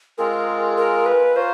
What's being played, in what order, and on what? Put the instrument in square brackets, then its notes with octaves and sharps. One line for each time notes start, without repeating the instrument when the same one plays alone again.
[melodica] G#3 C4 F4 G#4 [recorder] A#4
[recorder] A#4
B4
[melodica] F4 A#4 C#5 F5 [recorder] C5